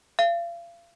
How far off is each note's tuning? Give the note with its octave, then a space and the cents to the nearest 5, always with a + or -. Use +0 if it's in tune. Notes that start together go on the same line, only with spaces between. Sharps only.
F5 -35